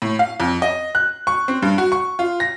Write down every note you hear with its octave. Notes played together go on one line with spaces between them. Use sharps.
A2
F5
F2
D#5
F#6
C#6
C4
G2
F#4
C#6
F4
A#6